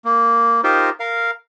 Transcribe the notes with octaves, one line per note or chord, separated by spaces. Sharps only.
A#3
D#4 F4 G4 A#4 C5
A#4 F5